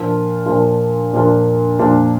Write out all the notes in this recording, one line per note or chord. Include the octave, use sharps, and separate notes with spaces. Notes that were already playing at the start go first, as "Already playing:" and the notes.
Already playing: A#2 F3 A#3 D4 F4
A#2 F3 A#3 D4 F4
A#2 F3 A#3 D4 F4
A#2 F3 A#3 D4 F4